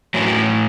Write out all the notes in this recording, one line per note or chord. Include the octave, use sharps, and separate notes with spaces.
A2 E3 F#3